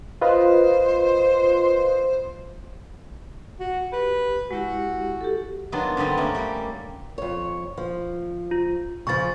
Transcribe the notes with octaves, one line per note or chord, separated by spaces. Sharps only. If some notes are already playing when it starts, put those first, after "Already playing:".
F4 B4 C5 D#5
F#4
G4 B4
G#3 E4 F#4 G4
G4 A4
D#3 F#3 B3 D4 F4
G2 D3 G3 B3 C4
A3 A#3 C#4 F#4
G3 G4
F2 C#5
F3
F4
C#3 F3 C#6 A6